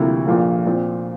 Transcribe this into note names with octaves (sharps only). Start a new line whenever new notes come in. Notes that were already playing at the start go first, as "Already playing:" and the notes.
Already playing: D2 C3 F3 A#3 E4
A#1 A#2 F3 A#3
A#2 F3 C4